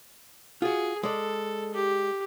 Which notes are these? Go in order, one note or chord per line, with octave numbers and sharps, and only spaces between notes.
F4 F#4 G#4
G#3 A4 D5
G4